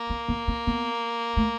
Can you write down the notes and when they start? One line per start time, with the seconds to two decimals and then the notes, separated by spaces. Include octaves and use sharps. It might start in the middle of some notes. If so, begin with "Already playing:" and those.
Already playing: A#3
0.10 C4
0.28 B3
0.48 C4
0.67 B3
1.37 A3